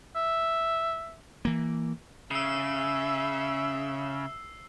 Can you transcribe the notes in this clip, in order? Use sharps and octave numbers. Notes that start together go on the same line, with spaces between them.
E5
E3 A#3
C#3 E5 E6 C7